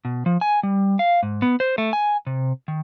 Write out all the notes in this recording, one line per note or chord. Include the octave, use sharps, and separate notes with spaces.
B2
F3
G#5
G3
F5
G#2
B3
C5
A3
G#5
C3
D#3